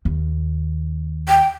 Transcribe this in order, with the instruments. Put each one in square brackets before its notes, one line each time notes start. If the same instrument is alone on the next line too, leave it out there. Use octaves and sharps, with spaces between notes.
[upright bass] D#2
[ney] G5